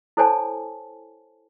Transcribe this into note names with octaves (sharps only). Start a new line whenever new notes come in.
E4 A4 C5 C#5 G#5 A5